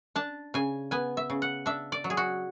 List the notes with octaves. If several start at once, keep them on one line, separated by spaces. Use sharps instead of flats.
D4 A5
C#3 G#5
B3 G#5
E5
C#3
F#5
D4 E5
D5
F#3
G#4
F#4